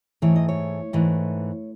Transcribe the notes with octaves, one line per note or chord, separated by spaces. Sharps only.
G#2 E3 A3 C#5
D#5
C#5
G#2 E3 A3